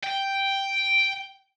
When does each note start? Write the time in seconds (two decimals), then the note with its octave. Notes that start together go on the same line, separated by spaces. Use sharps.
0.03 G5